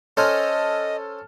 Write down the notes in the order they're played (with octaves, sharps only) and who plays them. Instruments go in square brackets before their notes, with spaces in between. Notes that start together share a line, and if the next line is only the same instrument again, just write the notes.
[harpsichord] C#4 C5 G#5 [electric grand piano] A4 A5 F6 [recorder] D#5